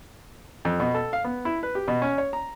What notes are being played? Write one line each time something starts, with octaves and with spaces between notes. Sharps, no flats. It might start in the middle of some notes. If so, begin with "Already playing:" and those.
F2
B2
A4
F5
B3
E4
B4
G4
B2
C#4
C#5
A#5